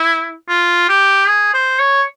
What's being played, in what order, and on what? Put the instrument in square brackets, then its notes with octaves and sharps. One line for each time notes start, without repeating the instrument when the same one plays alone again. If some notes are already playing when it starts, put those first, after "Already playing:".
Already playing: [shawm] E4
F4
G4
G#4
C5
C#5